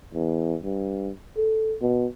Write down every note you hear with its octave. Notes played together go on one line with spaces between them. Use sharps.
E2
G2
A4
B2